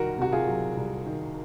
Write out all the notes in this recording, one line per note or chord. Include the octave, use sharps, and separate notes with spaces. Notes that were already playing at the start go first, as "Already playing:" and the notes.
Already playing: C2 D#3 F#4 A#4
C3 F#4
F4 G#4
F#3
C2
D#3